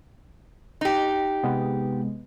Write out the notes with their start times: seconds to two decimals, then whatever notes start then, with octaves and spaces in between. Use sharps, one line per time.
0.81 D#4 G4
1.43 C3 G#3 B3